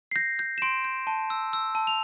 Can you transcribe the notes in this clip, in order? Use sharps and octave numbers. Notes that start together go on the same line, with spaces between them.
C7
G6 A#6
G6
E7
C6 D7
G6
A5
E6
E6
A5
F7